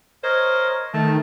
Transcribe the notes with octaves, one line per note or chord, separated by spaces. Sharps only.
A#4 C5 C#5 D#5
D#3 A3 A5